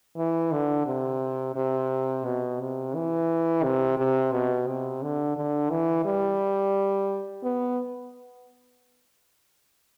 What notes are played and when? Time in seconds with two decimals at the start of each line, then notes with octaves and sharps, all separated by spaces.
0.17 E3
0.52 D3
0.86 C3
1.55 C3
2.25 B2
2.60 C3
2.95 E3
3.63 C3
3.98 C3
4.32 B2
4.67 C3
5.02 D3
5.36 D3
5.70 E3
6.05 G3
7.44 B3